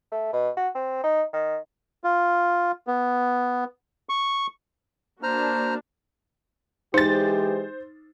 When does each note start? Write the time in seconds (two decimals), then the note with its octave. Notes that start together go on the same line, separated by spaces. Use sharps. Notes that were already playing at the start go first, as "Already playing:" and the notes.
0.12 A3
0.33 B2
0.57 F#4
0.75 C4
1.03 D#4
1.33 D#3
2.04 F4
2.87 B3
4.09 C#6
5.23 A#3 D4 F#4 C5 A#5 F6
6.94 E3 G#3 D#4 G4 C5 A6